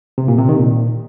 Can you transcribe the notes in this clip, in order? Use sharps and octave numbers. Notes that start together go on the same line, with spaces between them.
C3
A#2
C3
D#3
A#2